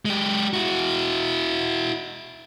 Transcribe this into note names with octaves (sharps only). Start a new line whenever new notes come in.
G#3 G4
E4 F#4